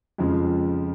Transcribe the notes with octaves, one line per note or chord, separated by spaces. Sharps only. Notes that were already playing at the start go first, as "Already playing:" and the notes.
F2 C#3 F3 G#3